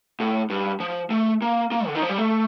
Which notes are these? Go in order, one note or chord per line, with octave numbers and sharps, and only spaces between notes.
A2
G2
F3
A3
A#3
A#3
D3
D#3
F3
G3
A3